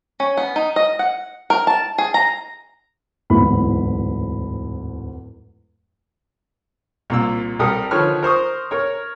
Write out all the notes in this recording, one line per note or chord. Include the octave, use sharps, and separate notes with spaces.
C#4
B3
D#4
D#5
F#5
A#4
A5
G#4
A#5
D1 E2 G#2 E4 B5
C2 A#2 E6
C2 G3 A4 A#4 D#6
D3 D#3 F3 B4 C#5 F6
A#4 C5 C#6 D#6
A#4 C#5